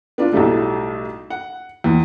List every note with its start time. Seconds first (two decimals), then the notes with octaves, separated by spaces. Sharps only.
0.18 B3 D4 F4
0.33 B1 A2 G3 A3
1.30 F#5
1.84 E2